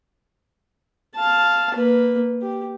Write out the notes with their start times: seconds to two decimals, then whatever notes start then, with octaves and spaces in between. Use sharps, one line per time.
1.15 F5 A5
1.75 A#3 B4
2.42 G4